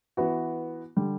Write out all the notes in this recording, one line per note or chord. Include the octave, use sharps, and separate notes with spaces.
E3 B3 F#4
D3 G3